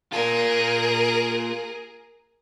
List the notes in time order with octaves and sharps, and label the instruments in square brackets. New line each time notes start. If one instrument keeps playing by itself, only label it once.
[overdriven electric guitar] A#3 F4 [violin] G#4 A#4